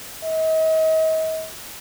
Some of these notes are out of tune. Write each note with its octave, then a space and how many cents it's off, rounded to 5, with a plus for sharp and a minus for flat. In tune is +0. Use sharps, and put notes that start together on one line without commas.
D#5 +40